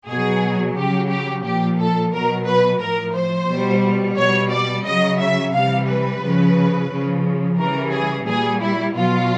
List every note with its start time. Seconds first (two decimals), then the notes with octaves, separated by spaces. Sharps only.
0.08 B2 F#3 G#4
0.77 C#3 F#3 G4
1.10 G4
1.45 A#2 F3 G4
1.79 A4
2.13 B2 F#3 A#4
2.47 B4
2.81 A2 F3 A#4
3.15 C5
3.49 B2 G3
4.17 B2 G3 C#5
4.53 D5
4.85 C#3 F#3 D#5
5.21 E5
5.54 C3 E3 G3 F5
5.88 B4
6.22 C#3 F3
6.90 C#3 F3
7.58 C#3 E3 G3 A#4
7.92 G#4
8.27 A#2 G3 G#4
8.61 E4
8.95 B2 F#3 F4